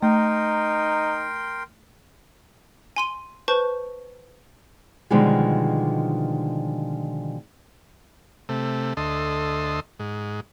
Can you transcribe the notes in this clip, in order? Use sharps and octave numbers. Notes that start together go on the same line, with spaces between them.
A3 D#4 A#4 G5 C6
G#5 C6 D#7
B4 C5 A5 C#6 G6
B2 D3 D#3 F3 G3 G#3
C3 A3
D2 A4 D#5 C6
G#2